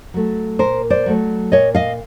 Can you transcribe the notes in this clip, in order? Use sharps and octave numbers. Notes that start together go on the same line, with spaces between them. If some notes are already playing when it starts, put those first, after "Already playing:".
F#3 A3
A#2 A#4 C5
C5 D5
F#3 A3
A#2 C#5 D#5
D#5 F5